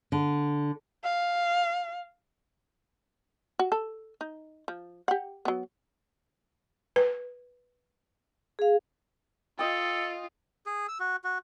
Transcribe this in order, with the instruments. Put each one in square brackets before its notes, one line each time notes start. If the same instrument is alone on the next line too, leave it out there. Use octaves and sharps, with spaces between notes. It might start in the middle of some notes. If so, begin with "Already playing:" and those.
[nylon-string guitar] D3
[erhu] F5
[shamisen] F#4
A4
D#4
F3
G4 F#5
F#3 B3
[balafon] B4
[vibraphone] G#4 F5
[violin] F4 [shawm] A4 [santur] D#5 G5
[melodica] G#4
E6
F#4
F#4